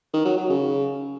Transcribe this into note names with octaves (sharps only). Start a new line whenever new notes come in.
D#3
F#3
F#3
C#3